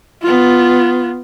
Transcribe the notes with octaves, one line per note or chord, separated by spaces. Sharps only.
B3 F4